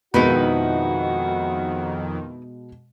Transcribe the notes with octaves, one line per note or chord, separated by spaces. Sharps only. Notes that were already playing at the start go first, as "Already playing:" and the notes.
F2 B2 D#3 G#3 D#4 E4 F#4 B4